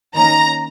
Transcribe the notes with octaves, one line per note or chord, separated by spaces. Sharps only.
D#3 A#3 C#4 A#5